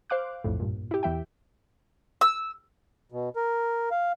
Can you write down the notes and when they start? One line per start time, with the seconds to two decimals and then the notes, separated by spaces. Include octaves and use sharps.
0.10 C5 F5 D6 F#6
0.44 B1 F2 A2
0.60 G2 A#2
0.91 E4 G4
1.03 E2 E3 E5 G5
2.21 E6
3.12 B2
3.36 A#4
3.91 F5